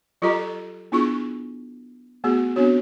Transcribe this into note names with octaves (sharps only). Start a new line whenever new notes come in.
F#3 F4 G4 A4 D#5 A#5
A4
B3 D4 E4 F4 G#4 C#6
A3 B3 F#4 G#4
B3 C4 D4 F#4 C#5